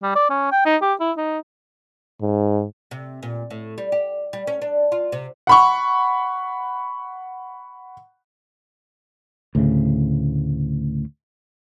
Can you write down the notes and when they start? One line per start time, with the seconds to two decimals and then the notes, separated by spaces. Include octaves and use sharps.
0.03 G3
0.15 D5
0.30 C#4
0.52 G5
0.66 D#4
0.82 G4
1.00 E4
1.17 D#4
2.21 G#2
2.91 C3
3.23 A#2
3.50 A2
3.78 G3
3.92 G4
4.33 G3
4.47 C#4
4.62 D4
4.92 F4
5.12 C3
5.47 F#5 B5 C#6
9.55 D2 A2 C#3